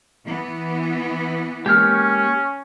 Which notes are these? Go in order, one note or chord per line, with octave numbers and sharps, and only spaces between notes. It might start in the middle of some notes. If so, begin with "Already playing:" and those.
E3 B3
G#3 A#3 C#4 G4 C#5 F6